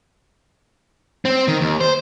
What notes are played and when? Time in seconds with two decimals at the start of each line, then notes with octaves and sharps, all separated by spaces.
1.25 C4
1.48 D#3
1.61 D#2
1.80 C5